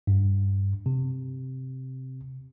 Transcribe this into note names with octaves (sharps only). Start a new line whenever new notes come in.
G2
C3